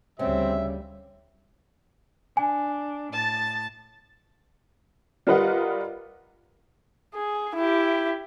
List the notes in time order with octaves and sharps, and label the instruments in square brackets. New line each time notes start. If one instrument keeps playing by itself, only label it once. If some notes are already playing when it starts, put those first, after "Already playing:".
[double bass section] D2 G3 [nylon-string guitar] C#3 [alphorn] C4 [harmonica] E5
[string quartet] D4 [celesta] G#5
[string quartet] A2 A5 A6
[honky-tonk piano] G3 F4 A#4 B4 D#5 F#5
[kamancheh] G#4
E4 G4